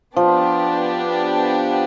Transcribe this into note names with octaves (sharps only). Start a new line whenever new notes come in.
F3 B3 D4 G4